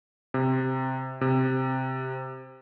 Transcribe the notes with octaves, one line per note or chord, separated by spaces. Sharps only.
C3
C3